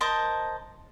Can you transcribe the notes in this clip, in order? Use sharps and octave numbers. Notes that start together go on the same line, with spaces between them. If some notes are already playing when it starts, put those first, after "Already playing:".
A#4 C5 D#5 A5